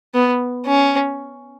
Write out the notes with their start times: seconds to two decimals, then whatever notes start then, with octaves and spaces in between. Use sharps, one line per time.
0.14 B3
0.66 C#4